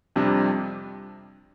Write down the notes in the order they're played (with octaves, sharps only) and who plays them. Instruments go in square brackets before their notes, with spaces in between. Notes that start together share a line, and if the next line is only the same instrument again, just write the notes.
[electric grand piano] F2 C3 G3 D4